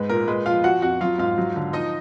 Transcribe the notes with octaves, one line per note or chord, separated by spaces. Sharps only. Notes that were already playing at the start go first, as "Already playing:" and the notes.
Already playing: G#2 G#3 B4
A#2 A#4
G#3 B4
F3 F4 F5
F3 F#4 F#5
F2 F#4 F#5
F#3 F4 F5
G#2 F4 F5
F#3
D3
F3 D#4 D#5